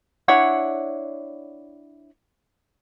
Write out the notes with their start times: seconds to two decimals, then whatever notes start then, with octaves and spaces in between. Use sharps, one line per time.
0.28 D4 E4 C#5 F#5